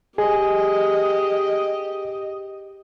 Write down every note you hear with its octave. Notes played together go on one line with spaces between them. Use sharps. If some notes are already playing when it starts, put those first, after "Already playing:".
G4 G#4 D#5